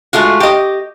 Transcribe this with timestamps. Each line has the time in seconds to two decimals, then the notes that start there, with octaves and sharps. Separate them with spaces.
0.13 G#3 A3 F4 F#4
0.40 G4 D#5